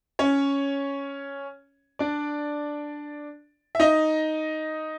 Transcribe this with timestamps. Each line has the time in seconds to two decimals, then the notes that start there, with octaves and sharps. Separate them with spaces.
0.19 C#4 C#5
1.99 D4 D5
3.75 E5
3.80 D#4 D#5